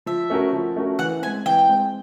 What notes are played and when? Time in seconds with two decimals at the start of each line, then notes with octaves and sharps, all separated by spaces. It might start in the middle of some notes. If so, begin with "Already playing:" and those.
0.06 F3 E5
0.30 A3 C#4 F#4 A#4
0.53 F3
0.76 A3 C#4 F#4 A#4
0.99 E3 F#5
1.22 C4 G#5
1.26 G#3
1.46 E3 G5
1.69 G#3 C4